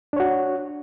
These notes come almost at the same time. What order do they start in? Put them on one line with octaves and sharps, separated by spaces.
D4 C#5 F#4